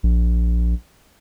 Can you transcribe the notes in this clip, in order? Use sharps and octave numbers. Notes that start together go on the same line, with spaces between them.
A#1